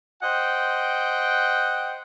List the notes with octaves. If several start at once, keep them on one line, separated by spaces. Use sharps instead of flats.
C5 D#5 F#5 G5